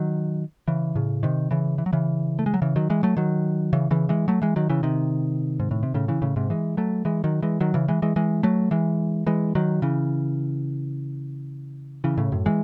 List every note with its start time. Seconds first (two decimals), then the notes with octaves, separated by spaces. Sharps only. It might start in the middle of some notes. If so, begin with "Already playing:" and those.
Already playing: D#3 F#3
0.68 C#3 E3
0.95 A2 C#3
1.23 C3 D#3
1.51 C#3 E3
1.78 E3
1.86 F#3
1.93 C#3 E3
2.39 A3
2.46 G#3
2.54 F#3
2.62 C#3 E3
2.76 D#3 F#3
2.90 E3 G#3
3.03 F#3 A3
3.17 D#3 F#3
3.73 C#3 E3
3.91 C#3 E3
4.09 E3 G#3
4.28 F#3 A3
4.42 E3 G#3
4.56 D#3 F#3
4.70 C#3 E3
4.83 C3 D#3
5.60 G#2
5.71 A2
5.83 C3
5.94 A2 C#3
6.08 C#3 E3
6.22 A2 C#3
6.36 G#2 C3
6.50 E3 G#3
6.77 F#3 A3
7.05 E3 G#3
7.24 D#3 F#3
7.42 E3 G#3
7.61 D#3 F#3
7.74 C#3 E3
7.88 E3 G#3
8.02 E3 G#3
8.16 E3 G#3
8.43 F#3 A3
8.71 E3 G#3
9.26 E3 G#3
9.55 D#3 F#3
9.82 C#3 E3
12.04 C#3 E3
12.18 A2 C#3
12.32 F#2 A2
12.46 E3 G#3